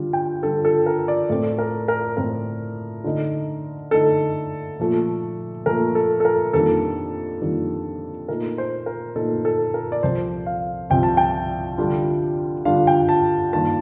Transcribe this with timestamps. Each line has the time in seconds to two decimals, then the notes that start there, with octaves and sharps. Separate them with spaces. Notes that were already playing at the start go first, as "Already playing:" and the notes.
Already playing: D3 G3 D4 F4
0.13 G5
0.42 D3 G3 D4 F4 A4
0.65 A4
0.86 A#4
1.08 D5
1.30 A2 A3 C4 D5
1.58 A#4
1.88 A#4
2.17 A2 A3 C4 A#4
3.04 D3 A3 D#4
3.91 D3 A3 D#4 A4
4.80 A#2 F3 A3
5.66 A#2 F3 A3 A#4
5.95 A4
6.20 A4
6.25 A#4
6.53 F2 D#3 G3 A#3 D4 A4
7.41 F2 D#3 G3 A#3 D4
8.29 A#2 A3 D#4 A#4
8.58 C5
8.86 A#4
9.16 A#2 A3 D#4 A4
9.45 A4
9.74 A#4
9.92 D5
10.03 C2 C3 F3 C4 C5
10.46 F5
10.90 C2 C3 F3 C4 G5
11.03 A5
11.17 G5
11.78 D3 G3 D4 F4
12.65 D3 G3 D4 F4 F5
12.87 G5
13.09 A5
13.52 G2 D#3 A#3 F4 A5